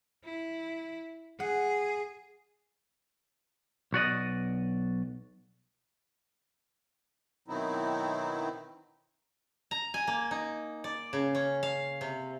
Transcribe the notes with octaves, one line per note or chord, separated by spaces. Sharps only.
E4
G#4 F#5
B1 F#4 D5 D#5
B2 D#3 F#3 C4 D#4 E4
A#5
G#5
A#3
D#4
D5
C#3
C#4
F5
C3